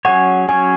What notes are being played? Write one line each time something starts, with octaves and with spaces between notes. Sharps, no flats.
F#3 C#4 G#4 C#5 F#5
F#3 C#4 G#4 C#5 G#5